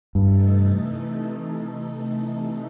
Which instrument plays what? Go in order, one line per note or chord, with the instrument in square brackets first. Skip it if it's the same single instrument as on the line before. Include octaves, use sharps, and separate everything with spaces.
[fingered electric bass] G2 [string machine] C3 E3 A3 D#4 A4